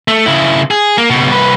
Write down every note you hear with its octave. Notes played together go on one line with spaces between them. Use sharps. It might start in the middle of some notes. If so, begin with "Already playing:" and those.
A3
C#3 E4
G#4
A#3
C#2 B2
C2 B4